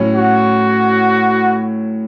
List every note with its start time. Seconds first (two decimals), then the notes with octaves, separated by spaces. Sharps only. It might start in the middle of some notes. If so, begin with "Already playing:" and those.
Already playing: A2 F#3 C#4
0.16 F#4